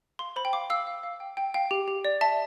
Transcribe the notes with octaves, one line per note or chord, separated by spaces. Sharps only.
F5 C6
C5 B5
G5
F5 D6
F5 E6
F5
F5
G5
G5
F5 G5
G4
G4
D5
E5 A5